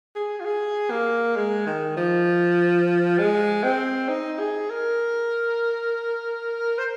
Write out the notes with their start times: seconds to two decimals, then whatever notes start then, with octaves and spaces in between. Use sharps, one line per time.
0.15 G#4
0.40 F4
0.45 G#4
0.90 A#3
1.36 G#3
1.66 D#3
1.97 F3
3.18 G#3
3.63 C4
4.09 D#4
4.40 G#4
4.70 A#4
6.78 C5